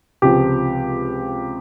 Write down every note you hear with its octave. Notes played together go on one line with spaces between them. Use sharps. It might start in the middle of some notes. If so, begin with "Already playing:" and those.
C#2 C3 F3 G4